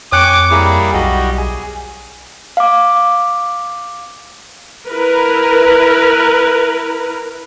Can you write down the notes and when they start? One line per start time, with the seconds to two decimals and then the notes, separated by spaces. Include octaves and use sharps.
0.12 F2 C#5 G5 G#5 C#6 D6 F#6 C#7
0.51 G3 A#3 E4 G#4
0.94 B1 F#4 D#5 F#5
1.38 G#4 G#5
2.57 F5 D6
4.88 E4 A#4 B4